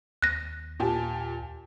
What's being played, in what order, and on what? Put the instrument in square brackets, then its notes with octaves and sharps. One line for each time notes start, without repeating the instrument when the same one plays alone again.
[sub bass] D#2 [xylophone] F#6 A#6
[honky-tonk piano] A#2 G4 G#5 [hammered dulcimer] A5